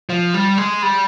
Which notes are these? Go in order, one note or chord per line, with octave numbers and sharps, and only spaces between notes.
F3
G3
G#3
G3